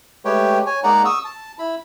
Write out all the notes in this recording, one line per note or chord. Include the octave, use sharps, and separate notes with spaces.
G#3 A3 G4 B4 C#5 G5
C#5 G#5
G#3 A#3 D#4 D5 F#5 A#5
C#6 D#6 E6
A5
E4 B5